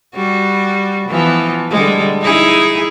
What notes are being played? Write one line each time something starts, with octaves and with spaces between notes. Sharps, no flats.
G3 F#4
E3 F3 B3
D3 G3 G#3
D#4 E4 G#4